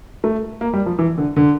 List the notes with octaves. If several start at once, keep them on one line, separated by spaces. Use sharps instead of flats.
A3
A#3
G3
F3
E3
D3
D3